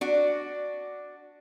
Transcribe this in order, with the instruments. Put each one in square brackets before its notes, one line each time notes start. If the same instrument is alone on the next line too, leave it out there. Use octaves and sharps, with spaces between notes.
[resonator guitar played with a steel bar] D4 F#4